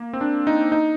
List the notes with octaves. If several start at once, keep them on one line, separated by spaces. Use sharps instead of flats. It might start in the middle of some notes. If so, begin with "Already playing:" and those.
Already playing: A#3
C4
D4
D#4
D#4